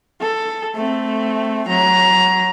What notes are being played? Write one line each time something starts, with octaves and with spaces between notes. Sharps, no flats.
A4
A3 C4
F#3 A#5